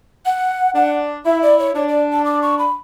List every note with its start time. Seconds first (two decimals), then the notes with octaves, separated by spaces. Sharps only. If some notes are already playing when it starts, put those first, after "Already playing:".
0.26 F#5
0.75 D4 F#5
1.25 E4 E5
1.42 D5
1.59 C#5
1.75 D4 C#5
1.88 D5
2.12 A5
2.25 D6
2.42 C#6
2.59 B5